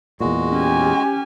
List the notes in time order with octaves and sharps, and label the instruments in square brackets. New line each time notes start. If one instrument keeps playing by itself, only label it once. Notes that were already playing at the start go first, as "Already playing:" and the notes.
[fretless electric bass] E2 A#2 [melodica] G#3 F#4
[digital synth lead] C#4 [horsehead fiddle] G4 G#5